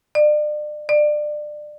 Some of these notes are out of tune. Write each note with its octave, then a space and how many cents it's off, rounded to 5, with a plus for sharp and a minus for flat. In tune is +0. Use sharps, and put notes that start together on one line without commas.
D5 +35
D5 +25